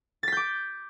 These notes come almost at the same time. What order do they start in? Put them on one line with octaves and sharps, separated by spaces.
A6 B6 G6 D6